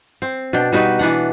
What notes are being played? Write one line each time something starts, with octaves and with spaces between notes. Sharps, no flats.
C4
B2 D4 G5
G3 D#4 F#4 B4
E3 B3 D4 F#5